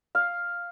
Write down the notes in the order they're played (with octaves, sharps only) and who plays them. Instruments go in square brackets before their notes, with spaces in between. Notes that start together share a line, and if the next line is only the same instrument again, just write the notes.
[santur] F5